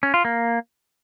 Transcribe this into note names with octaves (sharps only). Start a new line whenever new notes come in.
C#4
F4
A#3